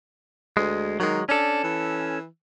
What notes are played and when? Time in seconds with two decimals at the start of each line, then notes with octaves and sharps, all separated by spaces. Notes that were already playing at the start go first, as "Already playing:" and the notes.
0.57 D2 G#3
1.00 D#3 F#3 G#3
1.29 C#4 D4 A4
1.64 E3